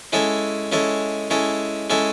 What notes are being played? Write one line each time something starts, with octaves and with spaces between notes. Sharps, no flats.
G#3 C#4 E4 A4 C#5
G#3 C#4 E4 A4 C#5
G#3 C#4 E4 A4 C#5
G#3 C#4 E4 A4 C#5